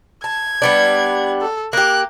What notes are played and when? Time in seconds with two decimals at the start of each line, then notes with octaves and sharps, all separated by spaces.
0.24 A5 G#6
0.62 G3 B3 D4
1.41 A4
1.73 A#3 G4 F#6